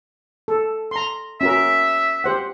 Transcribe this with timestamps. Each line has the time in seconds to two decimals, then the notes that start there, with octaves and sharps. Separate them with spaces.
0.48 A4
0.91 A#5 C6
1.41 C#4 F#4 A#4 E5
2.24 G4 C5 F#5